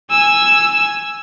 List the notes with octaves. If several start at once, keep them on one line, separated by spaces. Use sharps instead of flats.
G#5 E6